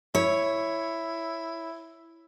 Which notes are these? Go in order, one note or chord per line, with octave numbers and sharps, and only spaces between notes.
E4 C#5